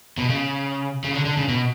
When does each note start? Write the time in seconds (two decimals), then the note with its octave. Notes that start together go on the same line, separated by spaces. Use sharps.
0.18 B2
0.29 C#3
1.04 C#3
1.14 D3
1.25 D3
1.37 C#3
1.48 B2